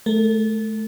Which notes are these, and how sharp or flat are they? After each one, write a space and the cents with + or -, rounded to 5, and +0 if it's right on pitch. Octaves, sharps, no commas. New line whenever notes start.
A3 -30 A4 +45